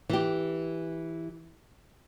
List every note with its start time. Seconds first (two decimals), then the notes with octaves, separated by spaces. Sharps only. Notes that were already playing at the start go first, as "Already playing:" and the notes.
0.09 E3 G4